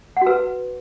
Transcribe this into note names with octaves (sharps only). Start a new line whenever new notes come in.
F#4 B4 F#5